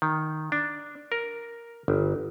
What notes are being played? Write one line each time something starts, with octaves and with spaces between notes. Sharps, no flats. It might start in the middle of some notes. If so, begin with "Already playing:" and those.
D#3
D4
A#4
G1